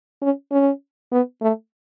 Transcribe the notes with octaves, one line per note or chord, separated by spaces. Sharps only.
C#4
C#4
B3
A3